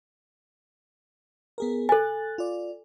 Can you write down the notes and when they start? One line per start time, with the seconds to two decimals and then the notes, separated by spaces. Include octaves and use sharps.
1.58 B3 G#4 A#4
1.89 A4 G#5 F#6 A6
2.38 F4 D5